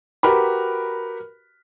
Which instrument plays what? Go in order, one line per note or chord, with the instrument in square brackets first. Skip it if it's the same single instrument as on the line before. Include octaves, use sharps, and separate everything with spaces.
[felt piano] F#4 G4 A#4 B4 B5